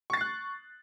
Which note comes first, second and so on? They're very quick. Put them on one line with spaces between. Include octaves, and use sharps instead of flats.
C#6 A6 C7 F#6